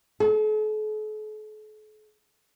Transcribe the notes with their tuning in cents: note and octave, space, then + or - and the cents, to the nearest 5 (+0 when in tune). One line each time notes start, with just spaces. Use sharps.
A4 -45